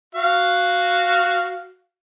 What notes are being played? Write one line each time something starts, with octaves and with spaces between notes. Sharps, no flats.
F#4 F5